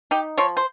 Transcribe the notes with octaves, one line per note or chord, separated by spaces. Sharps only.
D#4 G4
F3 C#5
C5